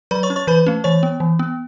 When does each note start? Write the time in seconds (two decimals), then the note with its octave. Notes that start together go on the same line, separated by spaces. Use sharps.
0.11 F#3 B4 B5
0.23 C#5 C#6
0.30 C#4
0.36 C#5 C#6
0.47 E3 B4 B5
0.66 A3 C#4
0.84 E3 C#5 C#6
1.03 B3
1.20 E3
1.39 B3